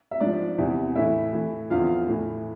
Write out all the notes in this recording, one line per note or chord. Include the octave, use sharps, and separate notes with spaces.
E5
G#2 F3 D4 D5
E2 C3 E3
A2 E3 E4 E5
A2 E3
E2 D3 F3 F4 F5
A2 E3